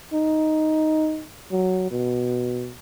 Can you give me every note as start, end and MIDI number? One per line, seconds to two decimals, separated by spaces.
0.13 1.24 63
1.51 1.91 54
1.91 2.74 47